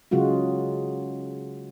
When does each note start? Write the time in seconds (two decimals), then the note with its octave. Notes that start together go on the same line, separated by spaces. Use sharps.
0.11 C#3 F#3 G#3 F4 F#4